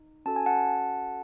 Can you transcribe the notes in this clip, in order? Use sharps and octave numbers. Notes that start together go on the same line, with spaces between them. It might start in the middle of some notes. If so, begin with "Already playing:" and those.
Already playing: D#4
C#4 F#4 A4 A5
G#5
F#5 A5